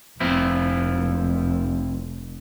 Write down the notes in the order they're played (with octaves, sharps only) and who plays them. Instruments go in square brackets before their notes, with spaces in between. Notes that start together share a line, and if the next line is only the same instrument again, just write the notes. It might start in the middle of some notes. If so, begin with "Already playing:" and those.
[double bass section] F1 [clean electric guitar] F3 C4 E4